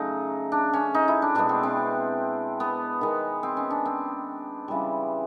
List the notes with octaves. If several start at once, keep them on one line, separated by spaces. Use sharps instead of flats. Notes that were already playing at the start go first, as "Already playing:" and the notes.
Already playing: C#3 F#3 A3 D#4
D4
C#4
D#4
E4
D4
B2 G#3 B3 D4
C4
C4
B3
D#3 G#3 B3
C4
C#4
D4
C4
C#3 E3 G3